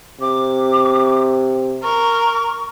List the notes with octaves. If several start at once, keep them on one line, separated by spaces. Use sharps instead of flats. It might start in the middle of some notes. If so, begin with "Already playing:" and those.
C3 D6
A#4 C#6